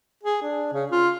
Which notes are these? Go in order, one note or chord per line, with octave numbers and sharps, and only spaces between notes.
G#4
D4
C#3
F4